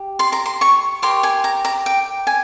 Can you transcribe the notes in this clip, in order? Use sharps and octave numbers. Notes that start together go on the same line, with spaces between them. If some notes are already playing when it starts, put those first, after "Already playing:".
Already playing: G4
C6
A#5
C6
C#6
G4 A#4 C#5 C6
G#5
A#5
A#5
G5
G#5